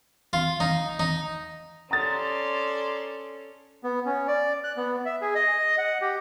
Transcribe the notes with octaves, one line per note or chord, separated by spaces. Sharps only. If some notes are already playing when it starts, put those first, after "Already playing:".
F4
D#4
D#4
C#4 A4 D5 A#5 C6 D#6 A6
B3
C#4
D5
F#6
B3
E5
G#4
D#5
F#5
G4